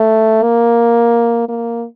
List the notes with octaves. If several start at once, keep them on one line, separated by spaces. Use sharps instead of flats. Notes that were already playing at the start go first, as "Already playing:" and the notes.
Already playing: A3
A#3
A#3